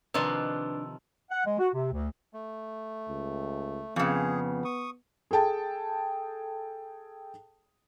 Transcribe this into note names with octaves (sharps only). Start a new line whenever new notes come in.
C3 D#3 F3 D4 B4 D5 D#5 E6
F#5
G#3
F#4
C3
D2
A3
C#2
F2 C#3 B3 G#4
C#6 D#6
G#4 A4 G5 A5